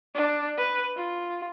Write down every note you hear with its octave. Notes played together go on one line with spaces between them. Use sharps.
D4
B4
F4